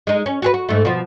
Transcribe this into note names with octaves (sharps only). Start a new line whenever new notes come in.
G#3 D#4
C#4
F#4 G#4 B4
F#4
G#2 A3
B2 F3